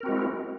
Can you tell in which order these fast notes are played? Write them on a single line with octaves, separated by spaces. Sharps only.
A#4 C4 F#4 G#3 E4